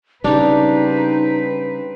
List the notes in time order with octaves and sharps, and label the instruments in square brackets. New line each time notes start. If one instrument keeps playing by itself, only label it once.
[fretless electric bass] C#3 G3 [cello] C4 B4 [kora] D4 [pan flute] D#4